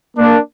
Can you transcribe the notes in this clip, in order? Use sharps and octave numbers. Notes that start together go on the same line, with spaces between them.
A#3 D4